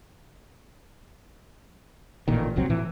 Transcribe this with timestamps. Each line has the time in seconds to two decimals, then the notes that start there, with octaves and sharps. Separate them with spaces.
2.28 A1 A#2 D#3
2.56 F1 C2 F#3 C4
2.69 A2 E3